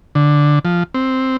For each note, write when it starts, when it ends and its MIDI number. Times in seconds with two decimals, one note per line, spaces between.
0.15 0.59 50
0.65 0.83 53
0.94 1.37 60